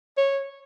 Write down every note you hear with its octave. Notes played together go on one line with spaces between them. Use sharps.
C#5